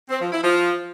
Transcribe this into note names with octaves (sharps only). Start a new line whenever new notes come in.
C4
F3
E4
F3